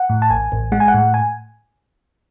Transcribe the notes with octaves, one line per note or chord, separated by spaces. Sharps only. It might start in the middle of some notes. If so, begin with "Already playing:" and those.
Already playing: F#5
A2
A5
A1 G#5
A1
G#3 F#5
G#5
F#5
A2
G#5